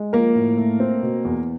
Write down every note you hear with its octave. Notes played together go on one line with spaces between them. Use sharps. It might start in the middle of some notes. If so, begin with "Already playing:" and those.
Already playing: G#3
F3 A#3 A#4
A2
A3
C4
B2
E2